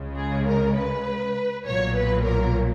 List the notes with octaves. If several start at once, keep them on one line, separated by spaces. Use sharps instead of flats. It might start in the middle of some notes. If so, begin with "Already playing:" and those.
Already playing: C#2 C#3 G#3
G#4
A#4
B4
B1 A#2 F#3 C#5
B4
A#4